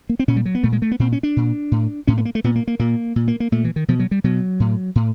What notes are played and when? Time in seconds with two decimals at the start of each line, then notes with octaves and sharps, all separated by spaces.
0.09 A#3
0.19 C4
0.28 A#2 C#4
0.36 G3
0.45 F#3
0.55 B3
0.63 A#2 A3
0.72 G#3
0.82 A3
0.91 B3
0.99 A#2 C4
1.12 C#4
1.23 D4
1.36 A#2
1.72 A2
2.07 A2 C#4
2.18 B3
2.25 A#3
2.35 A3
2.44 A#2 B3
2.56 A#3
2.68 A#3
2.80 A#2 A#3
3.16 A#2
3.28 A#3
3.40 A#3
3.52 A#2 A3
3.64 E3
3.76 D#3
3.88 B2 F3
3.99 F#3
4.11 G3
4.24 B2 F#3
4.60 A2
4.95 A2